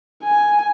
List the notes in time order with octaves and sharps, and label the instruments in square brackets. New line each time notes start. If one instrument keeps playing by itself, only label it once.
[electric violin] G#5